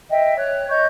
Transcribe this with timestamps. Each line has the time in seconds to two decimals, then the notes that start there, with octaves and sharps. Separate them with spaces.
0.10 D#5 E5 G5
0.37 C#5 F#6
0.70 C#5 D#5 C#6 G6